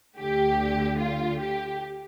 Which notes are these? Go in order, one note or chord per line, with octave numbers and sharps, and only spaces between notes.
D2 D3 A3 G4
F4
G4